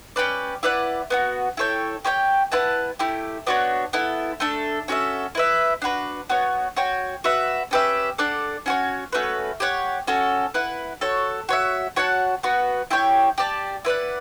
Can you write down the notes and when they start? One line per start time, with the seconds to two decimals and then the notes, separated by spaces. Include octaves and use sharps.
0.16 C#4 G4 B4 D5
0.63 E4 B4 D5 F#5
1.10 B3 D4 F#4
1.57 E4 A4 C#5 G5
2.04 G4 C#5 E5 G5
2.52 E4 B4 F#5 A5
2.99 A3 E4 G4
3.47 B3 D4 F#4 C#5
3.93 B3 E4 A4
4.40 A3 D4 A4
4.88 C#4 F#4 A4 E5
5.35 E4 B4 E5
5.82 D4 F#4 B4
6.29 B3 F#4 C#5
6.76 F#4 C#5 G5
7.24 F#4 B4 E5
7.71 C#4 G4 B4 E5
8.18 D4 A4 D5 F#5
8.66 C#4 F#4 C#5
9.12 A3 C#4 F#4 B4
9.60 G4 C#5 F#5
10.07 C#4 F#4 A4
10.54 E4 B4 F#5
11.01 F#4 A4 C#5
11.49 F#4 C#5 E5
11.96 F#4 C#5 F#5 A5
12.43 B3 F#4 B4
12.90 E4 G4 C#5 G5
13.38 G4 D5 A5
13.85 E4 B4 D5 F#5